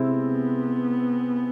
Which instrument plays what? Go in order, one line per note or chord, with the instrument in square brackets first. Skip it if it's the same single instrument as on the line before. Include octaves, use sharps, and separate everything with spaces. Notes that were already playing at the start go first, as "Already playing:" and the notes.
Already playing: [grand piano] C3 G#3 C4 E4 G#4
[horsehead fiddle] B3